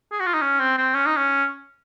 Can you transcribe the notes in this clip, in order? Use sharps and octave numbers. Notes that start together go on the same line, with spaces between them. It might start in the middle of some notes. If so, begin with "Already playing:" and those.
G#4
F#4
F4
D#4
C#4
C4
C4
C#4
D#4
C#4